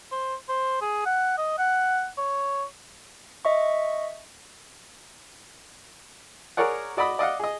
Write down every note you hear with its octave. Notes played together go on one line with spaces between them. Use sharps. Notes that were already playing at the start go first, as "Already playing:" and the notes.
C5
C5
G#4
F#5
D#5
F#5
C#5
D#5 E5 C#6
G#4 A#4 C#5 D5 F#5
F#4 D5 D#5 B5 D#6
D5 D#5 F5 F#5
G#4 D#5